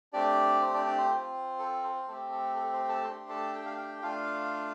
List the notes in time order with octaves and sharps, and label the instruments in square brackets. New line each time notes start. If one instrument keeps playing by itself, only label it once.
[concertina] A3 C4 D4 G4 D5
C5
D4 D5
D4 D5
C5
C4 F4
A4
C5
A3 C4 G4 A4
A4
A4
C5
A4 A5
A3 D4 G4 C5 C6
A4 A5
G5
F5
G4 G5
A3 D4 F4 F5